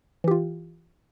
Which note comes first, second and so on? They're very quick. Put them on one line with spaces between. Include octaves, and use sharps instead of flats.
E3 G4 F4